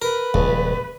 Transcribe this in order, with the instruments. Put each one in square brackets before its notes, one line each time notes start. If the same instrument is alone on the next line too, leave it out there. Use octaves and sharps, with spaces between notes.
[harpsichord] A#4 [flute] B4
[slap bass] D#1 F3 [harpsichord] C#2